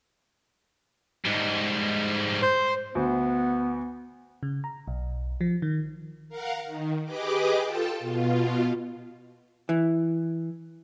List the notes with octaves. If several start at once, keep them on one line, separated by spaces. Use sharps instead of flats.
G#2 G3
C5
D2 B3
C#3
A#5
B1
F3
D#3
A#4 F5 F#5
D#3
G4 G#4 B4 D#5 D6
F4 A4 G5 A5
B2 F4
E3